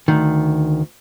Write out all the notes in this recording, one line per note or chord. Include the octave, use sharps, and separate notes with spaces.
D2 D#3